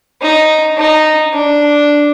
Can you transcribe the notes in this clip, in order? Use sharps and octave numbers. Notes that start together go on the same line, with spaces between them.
D#4
D#4
D4